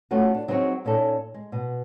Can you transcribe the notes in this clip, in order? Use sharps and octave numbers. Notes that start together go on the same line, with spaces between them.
F#3 A3 C#4 F4 F#4
D4
F#3 C4 D#4 G#4 C5 C#5
A#2 C#4 D#4 A4
G#3
B2